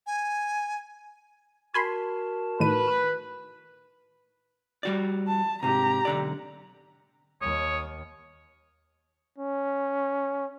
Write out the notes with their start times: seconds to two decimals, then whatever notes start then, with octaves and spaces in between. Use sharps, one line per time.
0.07 G#5
1.74 F#4 A#4 G#5 A5 B5 C6
2.60 A2 D#3 B4 D#7
4.83 G3 F#4 D5
5.28 A5
5.63 G#2 C3 G4 A#5
6.05 B1 D3 D5
7.42 D#2 C#5 D#6
9.38 C#4